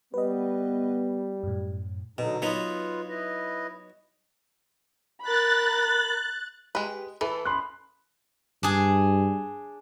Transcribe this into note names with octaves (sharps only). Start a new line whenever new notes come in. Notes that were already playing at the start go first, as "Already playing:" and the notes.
G3 B3 B4 D#5
F#2 A2
B2 D3 F#3 D#4
F#3 B3 D#4 F4 B4
E4 B4 D#5
A#4 B5 F#6 A6
G#3 G4 B4
E3 A4 B4
F#2 B5 C6 F#6
G2 D4 G#4